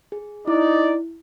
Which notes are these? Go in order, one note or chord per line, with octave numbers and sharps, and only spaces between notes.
G#4
D#4 E4 D5